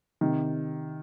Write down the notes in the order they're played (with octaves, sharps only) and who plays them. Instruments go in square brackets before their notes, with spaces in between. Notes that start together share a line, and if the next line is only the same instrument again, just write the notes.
[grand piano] C3 D#3